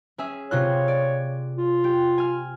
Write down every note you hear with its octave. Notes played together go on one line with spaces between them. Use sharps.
C#4 G#4 E5
C3 F4 C#5 F#6
D5
F4
G4
G#5 F6